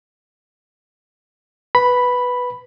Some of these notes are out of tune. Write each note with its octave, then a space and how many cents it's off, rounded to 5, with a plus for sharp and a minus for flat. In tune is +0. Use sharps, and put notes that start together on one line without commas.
B4 +0 B5 +0